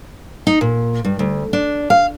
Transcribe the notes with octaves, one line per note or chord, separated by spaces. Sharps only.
D#4
A#2
G2
D2
D4
F5